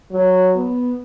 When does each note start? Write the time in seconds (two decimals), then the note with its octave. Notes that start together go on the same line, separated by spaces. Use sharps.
0.12 F#3
0.55 B3